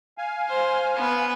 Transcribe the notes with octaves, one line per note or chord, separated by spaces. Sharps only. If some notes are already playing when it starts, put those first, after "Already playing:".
F5 G#5
C5
B3 B4